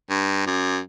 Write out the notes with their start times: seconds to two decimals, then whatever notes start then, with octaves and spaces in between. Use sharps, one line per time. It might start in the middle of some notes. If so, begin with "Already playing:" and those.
0.10 G2
0.47 F#2